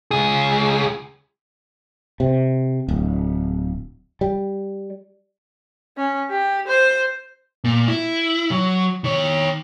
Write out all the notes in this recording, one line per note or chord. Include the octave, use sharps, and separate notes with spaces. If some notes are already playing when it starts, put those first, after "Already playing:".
C#2 G#4
C3
D1
G3
C#4
G4
C5
A#2
E4
F#3
D#3 C#5